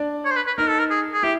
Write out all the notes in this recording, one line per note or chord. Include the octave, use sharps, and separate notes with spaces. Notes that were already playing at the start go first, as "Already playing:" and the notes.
Already playing: D4 D5
C#5
C5
B4
B4
D#4 A#4 D#5
A4
A#4
G#4
G#4
E4 G4 E5